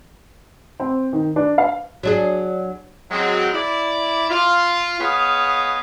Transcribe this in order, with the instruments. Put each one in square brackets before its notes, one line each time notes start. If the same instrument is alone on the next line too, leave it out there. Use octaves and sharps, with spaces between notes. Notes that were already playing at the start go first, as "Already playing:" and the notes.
[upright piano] C4
D#3
D4
F5
[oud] F#3 D4 G#4
[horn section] F#3 G#3 C4
E4 D5
F4
B3 G#4 C#5 D#5 F5